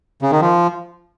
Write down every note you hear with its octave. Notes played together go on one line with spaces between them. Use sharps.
C#3
D#3
F3